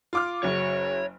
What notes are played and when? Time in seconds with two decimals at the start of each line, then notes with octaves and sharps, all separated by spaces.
0.13 F4 D6 F6
0.43 F#1 F#3 C#5